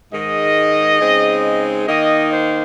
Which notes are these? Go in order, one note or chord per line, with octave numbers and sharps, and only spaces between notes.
G#2 D#3 G#3 D#5
C#3 G#3 C4 D#4
D#3 A#3 D#4 D#5
C5